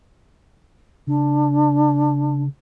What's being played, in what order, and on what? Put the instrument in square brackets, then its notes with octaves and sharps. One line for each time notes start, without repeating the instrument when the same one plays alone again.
[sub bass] C#3 [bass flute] D4